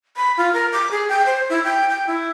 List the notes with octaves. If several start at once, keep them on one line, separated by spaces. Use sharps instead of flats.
B5
F4
A#4
D6
G#4
G5
C5
E4
G5
G5
E4